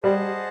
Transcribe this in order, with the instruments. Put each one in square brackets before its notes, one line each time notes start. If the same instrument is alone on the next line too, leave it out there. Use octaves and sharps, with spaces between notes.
[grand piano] G3 [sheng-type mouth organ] G#4 C5 D#5 F#5 A5